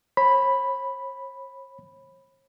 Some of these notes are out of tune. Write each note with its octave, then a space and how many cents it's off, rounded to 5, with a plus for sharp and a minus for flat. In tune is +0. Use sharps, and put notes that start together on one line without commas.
C#5 -45 B5 +0